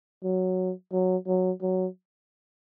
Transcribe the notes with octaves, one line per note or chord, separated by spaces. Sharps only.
F#3
F#3
F#3
F#3